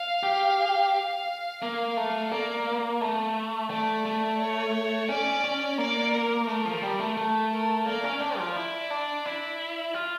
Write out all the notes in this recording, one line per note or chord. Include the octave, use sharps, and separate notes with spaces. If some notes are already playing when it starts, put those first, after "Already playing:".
Already playing: F5
G4
F5
A#3 F5
A3
A#3 D5
A3
A3 D5
A3
C#5
C#4 D5
C#4
A#3 D5
A#4
A3 A#4
F3
G3
A3
A3
A#4
A#3 D5
C#4
D4 D5
F3
E4
D4
E4
F4